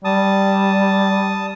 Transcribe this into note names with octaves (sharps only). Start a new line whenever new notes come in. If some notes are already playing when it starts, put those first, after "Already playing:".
G3 A5 D#6